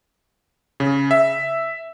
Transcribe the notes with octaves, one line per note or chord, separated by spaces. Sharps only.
C#3
E5